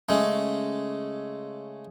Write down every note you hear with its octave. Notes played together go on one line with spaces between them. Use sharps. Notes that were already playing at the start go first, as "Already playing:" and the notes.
C#3 G#3 A3